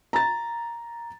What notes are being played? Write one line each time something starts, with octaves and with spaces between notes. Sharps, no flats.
A#5 A6